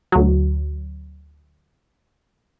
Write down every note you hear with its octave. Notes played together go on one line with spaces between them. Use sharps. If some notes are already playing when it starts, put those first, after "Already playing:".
D2 F#3